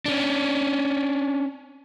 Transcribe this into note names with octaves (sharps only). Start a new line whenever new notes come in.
C#4 D4